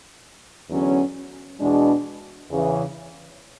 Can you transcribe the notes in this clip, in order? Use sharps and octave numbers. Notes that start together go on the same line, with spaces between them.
E2 D3 F#3 C#4
E2 B2 G#3 D4
E2 C#3 E3